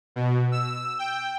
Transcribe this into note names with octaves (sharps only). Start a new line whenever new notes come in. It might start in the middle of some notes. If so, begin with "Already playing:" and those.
B2
E6
G5